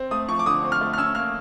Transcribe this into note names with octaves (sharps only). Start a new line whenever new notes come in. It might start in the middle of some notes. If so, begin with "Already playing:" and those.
Already playing: C4
A3 D#6
F3 C#6
D6
D3 D#6
C4
F6
A3
F6
C#4 E6
A#3 F6